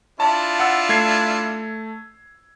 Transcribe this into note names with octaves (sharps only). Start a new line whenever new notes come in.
D4 E4 F4 A5
F#5 E6
A3 G#6 C7